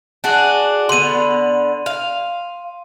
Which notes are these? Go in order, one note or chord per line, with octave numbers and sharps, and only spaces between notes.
D4 F#4 G#4
D3 B3 C6 D#7
F5